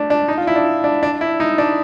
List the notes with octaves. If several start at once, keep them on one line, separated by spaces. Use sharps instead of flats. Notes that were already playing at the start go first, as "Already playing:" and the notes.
Already playing: A3 D4
D4
D#4
F4
E4
D4
D4
D4
E4
D#4
D4